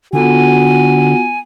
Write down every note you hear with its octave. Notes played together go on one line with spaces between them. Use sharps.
D3 B3 F4 F#4 G#5